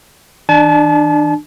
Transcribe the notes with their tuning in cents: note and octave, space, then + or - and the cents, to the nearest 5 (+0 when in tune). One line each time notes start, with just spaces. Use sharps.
E3 -45 D4 +25 A5 -40